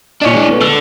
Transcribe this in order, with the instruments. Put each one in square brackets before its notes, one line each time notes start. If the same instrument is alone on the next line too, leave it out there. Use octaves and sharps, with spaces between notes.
[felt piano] A#2 D#5 [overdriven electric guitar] D4 C#5
[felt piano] E3 G#3
A3 B3 F4
[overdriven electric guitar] D3 [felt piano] E6